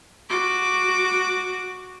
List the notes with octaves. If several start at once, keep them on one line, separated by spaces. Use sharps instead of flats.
F#4 D6